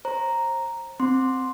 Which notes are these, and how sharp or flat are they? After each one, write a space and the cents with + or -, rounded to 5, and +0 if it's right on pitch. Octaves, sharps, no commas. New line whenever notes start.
C5 +30 A#5 +0
C4 +0 C6 +0